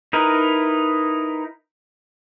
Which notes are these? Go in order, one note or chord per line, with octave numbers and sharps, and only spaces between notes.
D#4 E4 A#4 B4